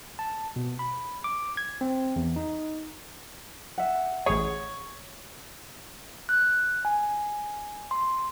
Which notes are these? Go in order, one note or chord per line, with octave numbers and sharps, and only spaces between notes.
A5
B2
B5
D6
G#6
C4
E2
D#4
E5 F#5
A1 G#4 C#5
F#6
G#5
C6